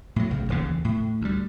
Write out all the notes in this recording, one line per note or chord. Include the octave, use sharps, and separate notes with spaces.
A2 F#3
B1 C#3
D1 D#2 C#3 E3
A2
D2 G3